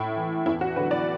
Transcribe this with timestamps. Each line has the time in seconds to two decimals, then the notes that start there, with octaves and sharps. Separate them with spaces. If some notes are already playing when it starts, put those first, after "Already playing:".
Already playing: A2 E4
0.16 E3
0.46 E2 E4
0.61 F#4
0.76 D3 F#3 B4
0.91 D5